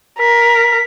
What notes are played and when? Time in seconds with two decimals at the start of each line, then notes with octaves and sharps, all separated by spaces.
0.19 A#4 B6